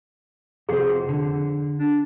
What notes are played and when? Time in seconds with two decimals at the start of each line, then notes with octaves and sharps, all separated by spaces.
0.69 F2 C3 G#4 C5 F#5
1.09 D3
1.79 D4